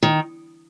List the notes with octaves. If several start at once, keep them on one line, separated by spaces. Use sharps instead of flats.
D#3